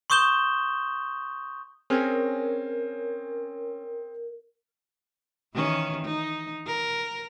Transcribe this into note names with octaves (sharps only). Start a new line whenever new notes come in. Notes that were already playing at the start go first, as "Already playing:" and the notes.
C6 C#6 D#6 G6 E7 G7
C4 C#4 G#4 A#4 F6
D#3 E3 C#4
D#4
A#4